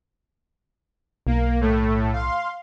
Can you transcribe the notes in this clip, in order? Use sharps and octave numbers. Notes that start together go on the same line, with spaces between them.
B1 A#3
A2 A3
F5 C6